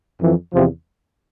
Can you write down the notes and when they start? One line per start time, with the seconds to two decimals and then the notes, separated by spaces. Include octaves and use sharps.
0.21 F2 E3
0.53 E2 C3 F3